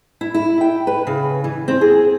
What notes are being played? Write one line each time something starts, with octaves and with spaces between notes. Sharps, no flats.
E4
E4
G5
B4
C#3
E3
C4
G#4